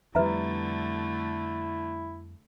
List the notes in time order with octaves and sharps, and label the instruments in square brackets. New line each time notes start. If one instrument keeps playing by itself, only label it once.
[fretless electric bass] F2 G3 [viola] D3 A3 [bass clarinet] E4 [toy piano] B4 E5 A#5